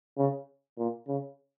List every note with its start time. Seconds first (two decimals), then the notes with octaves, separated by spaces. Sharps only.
0.18 C#3
0.78 A#2
1.08 C#3